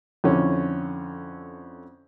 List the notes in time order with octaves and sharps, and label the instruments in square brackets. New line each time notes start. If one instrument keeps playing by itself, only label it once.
[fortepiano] F2 D3 C#4 E4